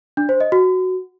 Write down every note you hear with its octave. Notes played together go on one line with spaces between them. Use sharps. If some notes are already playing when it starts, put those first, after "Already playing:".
D4
C5
D#5
F#4